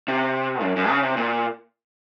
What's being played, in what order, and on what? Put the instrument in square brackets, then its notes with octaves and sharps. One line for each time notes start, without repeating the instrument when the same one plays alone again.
[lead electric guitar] C3
F#2
F#2
C#3
C3
A#2